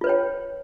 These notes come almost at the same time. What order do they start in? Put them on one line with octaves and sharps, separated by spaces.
F4 B4 C#5 G5